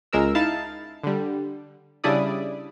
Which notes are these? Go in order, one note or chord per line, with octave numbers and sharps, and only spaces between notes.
C#2 G#3 A#4 E6
D#4 E4 F5 A5
D3 G3
C#3 G3 D4 E4 D5 D#6